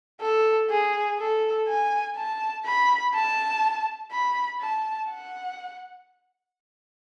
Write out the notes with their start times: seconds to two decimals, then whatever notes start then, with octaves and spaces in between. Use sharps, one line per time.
0.21 A4
0.70 G#4
1.19 A4
1.68 G#5
2.16 A5
2.65 B5
3.14 A5
4.12 B5
4.61 A5
5.10 F#5